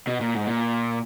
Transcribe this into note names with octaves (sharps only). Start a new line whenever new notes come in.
B2
A#2
G#2
A#2